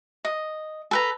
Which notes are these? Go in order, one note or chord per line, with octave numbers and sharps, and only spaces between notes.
D#5
A4 B4 A#5